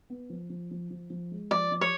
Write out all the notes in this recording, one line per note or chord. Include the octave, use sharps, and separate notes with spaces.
B3
F3
F3
F3
F3
F3
G#3
F3 D5
F3
C#5